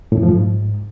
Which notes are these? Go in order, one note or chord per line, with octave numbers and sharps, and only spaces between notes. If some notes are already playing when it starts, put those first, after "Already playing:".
A2
F2
F3
G#2